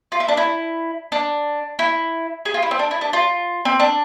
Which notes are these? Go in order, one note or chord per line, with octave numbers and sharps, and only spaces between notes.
F4
E4
D4
E4
D4
E4
G#4
F4
E4
C4
D4
E4
D4
F4
C4
D4